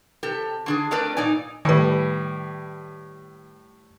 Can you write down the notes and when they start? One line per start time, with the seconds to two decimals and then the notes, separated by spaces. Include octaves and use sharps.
0.23 C3 G4 A4
0.66 D3 D4 G#4
0.91 A3 C4 D4 A#4 B4 D5
1.17 A#2 D#4 D5 G#5
1.65 A2 D#3 G3 B4